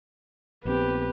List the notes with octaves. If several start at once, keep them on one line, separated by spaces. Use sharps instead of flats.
A#1 B3 C4 G4 B4